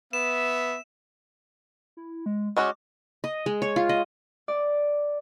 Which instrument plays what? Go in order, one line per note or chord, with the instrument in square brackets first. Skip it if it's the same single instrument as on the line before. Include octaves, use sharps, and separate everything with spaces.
[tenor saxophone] B3 [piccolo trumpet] E5 [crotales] E7
[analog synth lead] E4
G#3
[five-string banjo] G#3 C#4 F#4 [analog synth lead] D6
[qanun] D#5
G#3
C#5
F4
D#5
[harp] D5